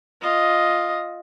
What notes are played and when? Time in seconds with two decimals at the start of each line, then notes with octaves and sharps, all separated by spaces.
0.21 F4 D#5